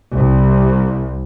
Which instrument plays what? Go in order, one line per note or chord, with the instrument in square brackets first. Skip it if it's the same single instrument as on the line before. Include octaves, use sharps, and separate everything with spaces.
[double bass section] C2